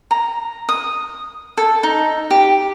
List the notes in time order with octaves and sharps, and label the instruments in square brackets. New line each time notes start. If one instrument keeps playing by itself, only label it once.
[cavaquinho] A#5
D#6
A4
D#4
G4